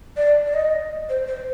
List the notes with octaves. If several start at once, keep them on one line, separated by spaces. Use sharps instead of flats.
D5
D5
D#5
C5
C5